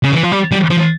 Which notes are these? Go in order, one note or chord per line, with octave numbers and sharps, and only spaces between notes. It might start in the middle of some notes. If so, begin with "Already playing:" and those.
C#3
E3
F3
G3
G3
F3